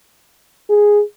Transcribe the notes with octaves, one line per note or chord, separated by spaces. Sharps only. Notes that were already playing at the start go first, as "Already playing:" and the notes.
G#4